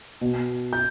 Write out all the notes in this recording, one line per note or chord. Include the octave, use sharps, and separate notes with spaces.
B2
G6